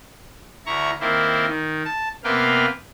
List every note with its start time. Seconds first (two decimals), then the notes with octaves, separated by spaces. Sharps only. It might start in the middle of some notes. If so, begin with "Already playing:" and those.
0.66 D2 E4 A#5 C#6
1.00 D#3 A#3 C4 E4 C5
1.48 D#3
1.85 A5
2.24 C3 A#3 B3 B4 F5 G5